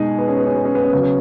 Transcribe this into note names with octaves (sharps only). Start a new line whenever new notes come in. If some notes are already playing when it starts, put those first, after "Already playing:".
Already playing: B2 G#3 D#4 G#4
B3
C#4
B3
C#4
B3
C#4
B3
C#4
C#3 F#3 B3
C#4